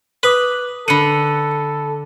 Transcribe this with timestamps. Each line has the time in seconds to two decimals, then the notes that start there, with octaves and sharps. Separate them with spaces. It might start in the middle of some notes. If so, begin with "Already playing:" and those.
0.23 B4 D6 D#6 F#6
0.88 D3 A4 F#5 B5 C#7 D#7